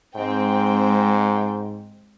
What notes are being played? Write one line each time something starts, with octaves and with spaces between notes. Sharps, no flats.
G#2 G#3 C4 G5